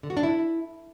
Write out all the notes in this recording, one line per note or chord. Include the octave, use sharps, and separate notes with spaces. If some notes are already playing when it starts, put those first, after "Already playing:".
D3
F#4
D4
E4